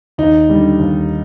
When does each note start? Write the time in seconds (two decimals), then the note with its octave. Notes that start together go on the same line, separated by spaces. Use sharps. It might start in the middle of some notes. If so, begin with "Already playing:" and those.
0.18 D#2 D#4
0.50 D3 G3
0.79 D#2